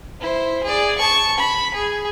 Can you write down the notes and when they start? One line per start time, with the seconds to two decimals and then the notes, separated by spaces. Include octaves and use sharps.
0.21 E4 C5
0.64 G#4 D5
0.98 A5 C#6
1.38 B5
1.74 G#4